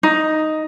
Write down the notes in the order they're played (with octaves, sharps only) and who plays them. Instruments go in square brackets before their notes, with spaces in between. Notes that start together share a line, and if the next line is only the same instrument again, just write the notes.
[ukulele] D#4